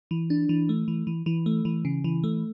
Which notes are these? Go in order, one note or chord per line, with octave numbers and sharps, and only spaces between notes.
E3
D4
E3
A3
E3
E3
E3
A3
E3
C#3
E3
A3